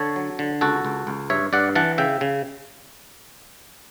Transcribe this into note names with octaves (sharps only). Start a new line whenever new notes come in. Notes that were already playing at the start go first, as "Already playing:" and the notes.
Already playing: D3 A4 C#5
F#3
D3
C#2 F#4 A4
C#2
C#2
G2 C#5 E5
G2 D5 F#5
E3 F#5 A5
C#3 E5 G5
C#3